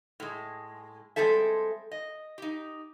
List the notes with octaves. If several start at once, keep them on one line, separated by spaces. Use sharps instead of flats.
A2 G#3
G3 G#3 C4 A4 E5
D#5
D#4 G4